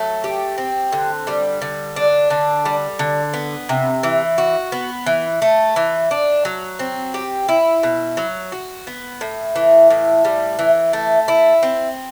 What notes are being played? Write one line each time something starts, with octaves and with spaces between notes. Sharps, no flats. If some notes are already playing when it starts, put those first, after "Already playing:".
Already playing: F#3 A3
G4
C4
D3
G3
D3
D4
D3
G3
D3
B3
C3
E3
F#4
B3
E3
A3
E3
D4
F#3
C4
G4
E4
B2
F#3
F#4
B3
A2
E3
A2
G3
E3
A3
E4
C4